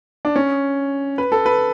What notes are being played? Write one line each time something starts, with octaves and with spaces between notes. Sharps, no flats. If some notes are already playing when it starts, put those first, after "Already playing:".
D4
C#4
B4
A4
B4